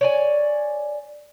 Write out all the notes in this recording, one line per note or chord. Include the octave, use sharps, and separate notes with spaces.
C#5 D5 G#5